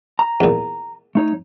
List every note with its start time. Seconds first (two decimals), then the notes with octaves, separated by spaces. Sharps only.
0.19 A#5
0.40 E2 A#2
1.15 A3 D#4 C#5